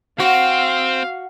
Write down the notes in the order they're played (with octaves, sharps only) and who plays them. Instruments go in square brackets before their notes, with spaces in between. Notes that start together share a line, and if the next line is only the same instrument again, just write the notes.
[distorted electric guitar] C4 [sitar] F#4 [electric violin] F5